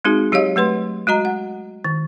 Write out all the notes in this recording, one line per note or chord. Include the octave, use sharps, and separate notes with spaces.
G#3 C4 D#4 F#4 G#4
F#3 G4 C#5 D#5 F5
F#3 A3 B4 C6
G#3 F#4 D#5 A#5
F#5
D#3